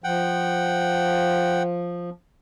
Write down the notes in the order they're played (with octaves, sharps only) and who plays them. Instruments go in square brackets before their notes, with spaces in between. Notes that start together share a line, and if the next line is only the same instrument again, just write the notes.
[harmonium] F3 [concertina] F#5 G5